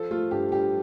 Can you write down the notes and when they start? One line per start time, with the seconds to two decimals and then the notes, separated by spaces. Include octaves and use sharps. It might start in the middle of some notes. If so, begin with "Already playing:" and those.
Already playing: F3 A4
0.11 A3 F4
0.31 G2 G4
0.52 G2 G4